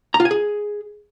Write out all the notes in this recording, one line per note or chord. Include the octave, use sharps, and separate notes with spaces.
A#5
F4
G#5
G#4